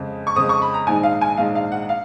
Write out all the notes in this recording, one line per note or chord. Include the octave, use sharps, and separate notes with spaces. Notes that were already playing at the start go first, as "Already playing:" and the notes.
Already playing: F2 C#3 G#3
C#6
F2 C#3 G#3 D#6
C#6
B5
A#5
A#1 G#2 D#3 G#3 G#5
F5
G#5
A#1 G#2 D#3 G#3 F5
F5
F#5
F5